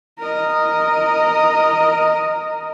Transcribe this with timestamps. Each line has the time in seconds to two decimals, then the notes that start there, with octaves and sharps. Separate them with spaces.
0.19 A#4 D#5